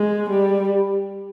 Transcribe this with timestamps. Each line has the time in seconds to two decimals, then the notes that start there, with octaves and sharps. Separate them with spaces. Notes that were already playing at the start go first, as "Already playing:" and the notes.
Already playing: G#3
0.30 G3